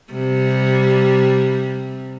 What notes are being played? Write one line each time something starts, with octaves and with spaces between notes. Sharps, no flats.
C3 G3